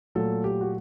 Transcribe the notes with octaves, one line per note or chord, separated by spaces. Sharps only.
A#2 F#3 A3 A4
G4
F#4